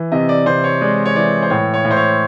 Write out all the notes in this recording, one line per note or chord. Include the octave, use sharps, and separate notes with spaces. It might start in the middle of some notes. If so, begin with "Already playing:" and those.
Already playing: E3
C3 D#5
D5
C3 C5
C#5
G#3 D5
C#5
E3 D5
C5
A2 C#5
C#5
A2
C5
C#5